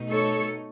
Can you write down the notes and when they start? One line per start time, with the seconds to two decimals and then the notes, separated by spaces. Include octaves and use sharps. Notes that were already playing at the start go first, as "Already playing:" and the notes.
Already playing: B2 A3 D#4
0.10 A4 C#5